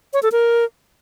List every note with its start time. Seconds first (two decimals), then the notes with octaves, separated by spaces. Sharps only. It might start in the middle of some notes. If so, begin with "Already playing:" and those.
0.13 C#5
0.23 A4
0.32 A#4